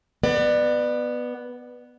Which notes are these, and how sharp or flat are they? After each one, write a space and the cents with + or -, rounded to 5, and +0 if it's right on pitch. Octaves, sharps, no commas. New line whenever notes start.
B3 +0 D5 +30